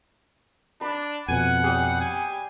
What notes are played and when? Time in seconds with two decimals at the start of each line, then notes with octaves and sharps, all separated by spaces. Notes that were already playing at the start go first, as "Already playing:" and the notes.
0.81 D4 B5
1.28 F2 B2 F#5 G#5
1.64 G3 G4 G#4
2.00 G#5